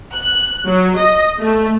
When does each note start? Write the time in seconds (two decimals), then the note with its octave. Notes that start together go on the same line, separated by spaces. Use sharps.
0.13 F#6
0.66 F#3
0.98 D#5
1.40 A3